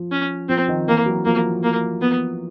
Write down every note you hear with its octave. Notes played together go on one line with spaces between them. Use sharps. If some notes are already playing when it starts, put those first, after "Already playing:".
Already playing: F3
C#4
F3 C4
D#3
E3 A#3
F#3
F3 A#3
A#3
B3